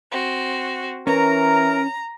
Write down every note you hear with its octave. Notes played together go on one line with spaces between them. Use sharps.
C4 F#4
E3 C#4 A#4 A#5